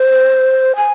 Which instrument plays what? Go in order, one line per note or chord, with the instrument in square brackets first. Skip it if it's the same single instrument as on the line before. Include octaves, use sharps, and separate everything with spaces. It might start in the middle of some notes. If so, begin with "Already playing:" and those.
Already playing: [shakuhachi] C5
G#5